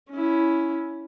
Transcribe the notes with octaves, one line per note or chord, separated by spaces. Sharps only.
C#4 E4